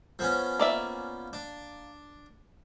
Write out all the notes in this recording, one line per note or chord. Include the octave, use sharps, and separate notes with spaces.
F3 B3 C#4
A#3 D5 E5
D4